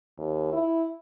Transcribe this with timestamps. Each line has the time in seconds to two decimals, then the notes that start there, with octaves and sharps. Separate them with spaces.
0.18 D#2
0.53 E4